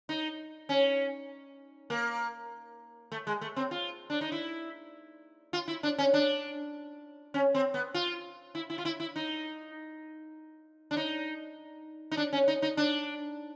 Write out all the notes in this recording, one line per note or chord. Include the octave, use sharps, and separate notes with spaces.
D#4
C#4
A#3
A3
G#3
A3
C4
F4
D4
D#4
E4
F4
E4
D4
C#4
D4
C#4
C4
B3
F4
E4
E4
F4
E4
E4
D#4
D4
D#4
D#4
D4
C#4
D#4
D#4
D4